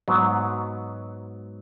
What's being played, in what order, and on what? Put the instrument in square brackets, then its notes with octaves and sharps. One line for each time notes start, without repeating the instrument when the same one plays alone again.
[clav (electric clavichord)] G#2 F#3 B3